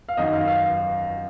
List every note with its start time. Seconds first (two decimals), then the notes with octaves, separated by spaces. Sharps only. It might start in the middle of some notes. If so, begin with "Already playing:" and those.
0.09 F5
0.17 F#2 D#3 F#3 D#5
0.33 F5
0.48 F5